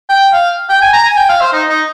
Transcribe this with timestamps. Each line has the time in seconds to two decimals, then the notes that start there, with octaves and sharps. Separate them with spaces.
0.09 G5
0.33 F5
0.69 G5
0.82 G#5
0.93 A#5
1.06 G#5
1.17 G5
1.29 F5
1.41 C5
1.53 D#4
1.69 D#4